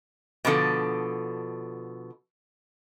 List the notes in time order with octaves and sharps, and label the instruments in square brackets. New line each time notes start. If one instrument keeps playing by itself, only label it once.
[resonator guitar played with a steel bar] B2 D3 F3 A4